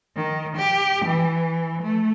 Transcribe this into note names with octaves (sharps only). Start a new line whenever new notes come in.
D#3
G4
E3
A3